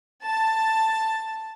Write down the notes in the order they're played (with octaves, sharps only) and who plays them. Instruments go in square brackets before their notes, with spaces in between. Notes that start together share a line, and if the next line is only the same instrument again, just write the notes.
[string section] A5